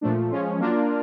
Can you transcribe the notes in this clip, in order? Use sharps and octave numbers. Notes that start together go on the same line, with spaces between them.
A#2 F3 A3 D4
F3 G#3 C#4 F4
F#3 A#3 D4 F4 A#4